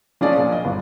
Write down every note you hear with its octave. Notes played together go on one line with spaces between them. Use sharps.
F3 C#4 D4 G#4 D5
A#2
D#5
G1